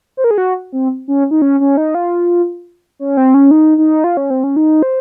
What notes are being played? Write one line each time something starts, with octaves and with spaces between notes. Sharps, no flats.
C5
A#4
G#4
F#4
C4
C#4
D#4
C#4
C#4
D#4
F4
C#4
C4
C#4
D#4
D#4
F4
C#4
C4
C#4
D#4
C5